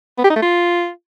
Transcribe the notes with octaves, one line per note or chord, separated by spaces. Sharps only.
B3
G4
D#4
A3
F4